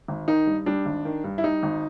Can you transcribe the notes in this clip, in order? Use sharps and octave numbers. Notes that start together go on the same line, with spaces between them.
G#1
D#3 D#4
G2
G3 D4
G#1
D#3
G2
E4
G3 D#4
G#1